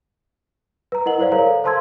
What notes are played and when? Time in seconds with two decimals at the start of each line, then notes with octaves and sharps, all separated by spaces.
0.92 B4 A#5
1.06 E4 A#4 D#5 F#5 F#7
1.18 E4 B4 C5 D5 F5
1.32 G#4 A#4 C5 C#5 F5 A#5
1.47 A4
1.64 C5 F5 A5 C6 E6 G#6